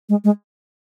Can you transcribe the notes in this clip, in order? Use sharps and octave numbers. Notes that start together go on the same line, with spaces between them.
G#3
G#3